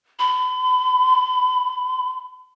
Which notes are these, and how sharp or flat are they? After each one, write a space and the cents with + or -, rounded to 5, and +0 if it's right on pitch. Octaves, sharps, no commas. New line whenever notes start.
B5 +40